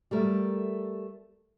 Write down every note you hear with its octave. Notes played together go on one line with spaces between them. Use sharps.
G3 A3 A#4